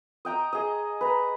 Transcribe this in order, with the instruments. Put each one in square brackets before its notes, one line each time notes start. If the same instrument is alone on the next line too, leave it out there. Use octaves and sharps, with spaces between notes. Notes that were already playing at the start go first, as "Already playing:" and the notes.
[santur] D#5 G5 A#5 D#6
G#4 D#5
B4 A#5